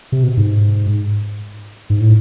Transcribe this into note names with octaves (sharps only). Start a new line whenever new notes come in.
C3
B2
G#2
G#2
A2